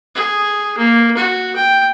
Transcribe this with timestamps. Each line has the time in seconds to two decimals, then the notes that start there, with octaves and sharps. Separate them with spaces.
0.15 G#4
0.77 A#3
1.16 F#4
1.55 G5